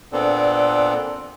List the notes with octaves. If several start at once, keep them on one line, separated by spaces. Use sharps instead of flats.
A#2 B3 C4 D4 A4